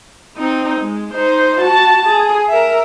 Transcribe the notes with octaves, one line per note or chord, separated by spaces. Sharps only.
C4 D#4
G#3
D#4 C5
F#4 A5
G#4
A#4 E5